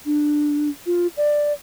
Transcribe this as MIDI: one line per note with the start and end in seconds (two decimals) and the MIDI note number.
0.06 0.69 62
0.86 1.07 65
1.17 1.52 74